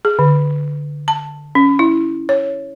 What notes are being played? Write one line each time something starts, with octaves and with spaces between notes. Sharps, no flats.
G#4
D3
A5
C#4
E4
C#5